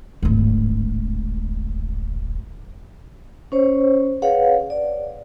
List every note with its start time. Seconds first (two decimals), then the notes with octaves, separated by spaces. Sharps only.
0.23 D1 G#1
3.52 C#4 C5 C#5
4.22 G#4 B4 C#5 F5 F#5
4.70 D5